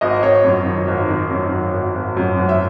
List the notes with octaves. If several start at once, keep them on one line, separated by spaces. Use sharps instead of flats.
G#1 D#5
G#1 C#5
F#2
D#3
G#1
D#3
F#2
G#1
G#1
G#1
F#2
G#1
E5